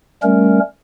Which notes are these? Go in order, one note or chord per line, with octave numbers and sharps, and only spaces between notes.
G3 A3 C#4 A#4